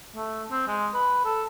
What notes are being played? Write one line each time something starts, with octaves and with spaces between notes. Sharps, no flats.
A3
C4
G#3
B4
A4